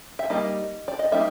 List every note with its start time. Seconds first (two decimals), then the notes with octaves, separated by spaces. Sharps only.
0.19 E5
0.30 G3 A#3 D#4 D#5
0.88 D5
0.99 D#5
1.12 G3 A#3 D#4 E5